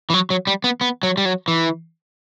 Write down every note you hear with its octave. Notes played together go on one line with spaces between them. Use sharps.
E3
F#3
F#3
G3
B3
B3
F#3
G3
F#3
E3